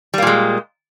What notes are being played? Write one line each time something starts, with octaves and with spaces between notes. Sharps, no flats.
A#2 G3 G#3 A#3